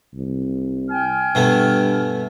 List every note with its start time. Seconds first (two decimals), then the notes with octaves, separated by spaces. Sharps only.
0.14 C2
0.90 G5 G#5 F6
1.35 G2 B2 A3 B3